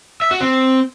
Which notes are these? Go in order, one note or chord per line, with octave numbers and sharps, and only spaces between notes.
E5
F#4
C4